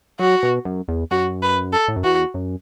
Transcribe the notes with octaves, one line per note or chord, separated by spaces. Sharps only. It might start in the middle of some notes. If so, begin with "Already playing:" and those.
F#3 F#4
B2
F#2
E2
F#2 F#4
B4
A4
A2
F#2
E2 F#4
F#2